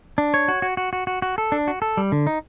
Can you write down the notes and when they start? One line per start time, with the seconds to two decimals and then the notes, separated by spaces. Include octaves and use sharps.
0.18 D4
0.34 C#5
0.48 F#4
0.62 F#4
0.77 F#4
0.93 F#4
1.07 F#4
1.22 F#4
1.38 A4
1.52 D4
1.68 F#4
1.82 A4
1.97 G3
2.12 D3
2.27 D#4